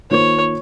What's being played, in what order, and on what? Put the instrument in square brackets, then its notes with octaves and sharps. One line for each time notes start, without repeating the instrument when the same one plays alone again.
[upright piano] D#3 A#3 F4 C5 [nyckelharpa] C#5